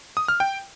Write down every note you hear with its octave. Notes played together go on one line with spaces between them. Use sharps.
D#6
F6
G5